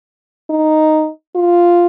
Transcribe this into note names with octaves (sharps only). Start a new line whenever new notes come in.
D#4
F4